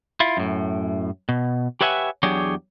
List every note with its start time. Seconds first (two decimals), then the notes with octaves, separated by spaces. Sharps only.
0.20 E4 F4
0.37 F#2 A2
1.29 B2
1.81 G4 B4 C#5 E5 F#5 G#5
2.23 E2 F#3 D4 G4 G#4 C#5